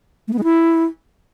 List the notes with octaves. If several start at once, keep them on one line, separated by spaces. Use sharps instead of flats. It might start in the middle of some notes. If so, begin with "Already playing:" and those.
A3
B3
G#3
E4